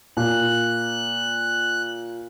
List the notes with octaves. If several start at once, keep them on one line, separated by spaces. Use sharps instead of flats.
A#2 F#6